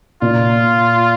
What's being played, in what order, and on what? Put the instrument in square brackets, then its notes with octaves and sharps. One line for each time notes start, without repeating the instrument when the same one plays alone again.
[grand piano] A#2 [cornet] F4